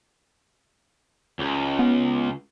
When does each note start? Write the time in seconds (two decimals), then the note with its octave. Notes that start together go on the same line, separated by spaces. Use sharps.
1.40 C#2
1.79 B3